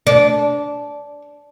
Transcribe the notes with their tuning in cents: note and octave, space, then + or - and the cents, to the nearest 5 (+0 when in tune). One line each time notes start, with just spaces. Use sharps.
D4 -15